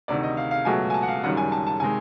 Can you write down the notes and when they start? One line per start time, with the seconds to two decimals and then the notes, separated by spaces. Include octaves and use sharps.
0.08 D2 C3 D#3 D5
0.23 D#5
0.37 F5
0.51 F5
0.65 C#2 B2 F#3 A3 G#5
0.90 G#5
0.94 A5
1.02 F#5
1.08 F5
1.23 F#1 F#2 D#3 G3 F#5
1.37 G#5
1.52 A5
1.67 A5
1.80 C3 D#3 G#3 G#5